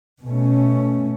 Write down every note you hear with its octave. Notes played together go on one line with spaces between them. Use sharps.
B2 A3 C#4